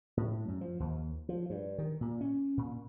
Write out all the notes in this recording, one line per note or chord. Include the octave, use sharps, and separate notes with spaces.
A2
F#2
F3
D#2
F3
G2
D#3
A#2
C#4
A#2